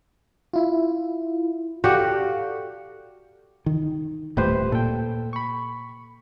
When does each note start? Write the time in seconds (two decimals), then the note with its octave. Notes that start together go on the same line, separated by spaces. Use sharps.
0.53 E4 F4
1.84 F#4 G4 A4 D5 F5
3.66 D#3
4.37 D#1 A2 G4 B4 C5
4.72 A#2 A4 G5
5.33 B5 C#6